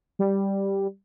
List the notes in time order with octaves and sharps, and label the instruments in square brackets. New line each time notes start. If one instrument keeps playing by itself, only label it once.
[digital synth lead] G3